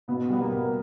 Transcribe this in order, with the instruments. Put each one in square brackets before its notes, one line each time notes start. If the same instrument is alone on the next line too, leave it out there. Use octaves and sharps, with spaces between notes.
[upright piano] B2 [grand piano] B3
[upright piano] G3 [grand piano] B3
[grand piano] A#3
[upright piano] B2